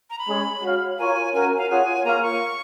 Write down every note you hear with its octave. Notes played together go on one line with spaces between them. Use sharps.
A#5
B5
G#3 C#4 G#4 C#5
F#4 C#5 F5
F4 A#4 C#5 F5 G#5
C#4 F#4 A#4 G#5
F5
F4 G#4 C#5 F#5 G#5
A#3 F4 A#4 C#5 F5 A#5
C#6